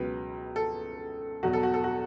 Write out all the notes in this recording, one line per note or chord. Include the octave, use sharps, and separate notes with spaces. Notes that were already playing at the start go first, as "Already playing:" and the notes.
Already playing: C#2 B2 F#3 B4
A4
E2 B2 F#3 F#4
A4
F#4
A4
F#4